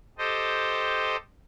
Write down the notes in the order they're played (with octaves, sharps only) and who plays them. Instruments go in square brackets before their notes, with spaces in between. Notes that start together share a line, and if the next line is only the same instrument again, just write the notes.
[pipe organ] G4 A4 C5 D#5